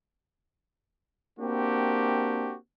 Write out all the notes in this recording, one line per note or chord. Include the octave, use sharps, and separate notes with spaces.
A#3 C4 D4 F#4 G4